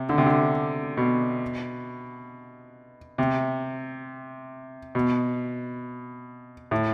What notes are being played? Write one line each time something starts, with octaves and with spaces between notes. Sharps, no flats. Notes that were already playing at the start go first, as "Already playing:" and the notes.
Already playing: C3
D3
C3
D3
B2
C3
B2
A2